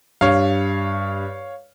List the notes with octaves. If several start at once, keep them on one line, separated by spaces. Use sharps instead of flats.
G2 C#5 F5